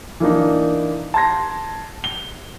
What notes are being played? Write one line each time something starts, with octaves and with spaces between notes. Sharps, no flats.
E3 A#3 D4 D#4
A5 C6 G#6 A#6
G7